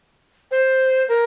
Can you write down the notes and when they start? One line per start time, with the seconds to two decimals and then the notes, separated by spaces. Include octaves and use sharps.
0.51 C5
1.09 A#4